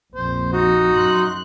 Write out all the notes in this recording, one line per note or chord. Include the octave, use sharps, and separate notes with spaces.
A#1 F2 C5
D#4 F#4
F#2 C6 F#6